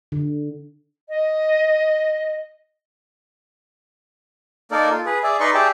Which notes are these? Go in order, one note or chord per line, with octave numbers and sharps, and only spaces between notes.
D3
D#5
A#3 D#4 A4 A#4 D5
F4
G#4 B4
G#4 D5 E5
D#4 B4 D5 D#5 C6 C#6
G4 G#4 D5 E5 G5 A5